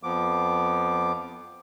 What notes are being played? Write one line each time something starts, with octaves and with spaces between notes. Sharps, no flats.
F2 F3 B3 D6